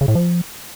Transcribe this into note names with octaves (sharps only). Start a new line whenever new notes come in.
C#3
A2
F3